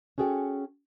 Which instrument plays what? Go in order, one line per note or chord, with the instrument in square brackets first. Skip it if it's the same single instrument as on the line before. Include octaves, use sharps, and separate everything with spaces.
[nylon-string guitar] C#4 F#4 G#4 A4 G5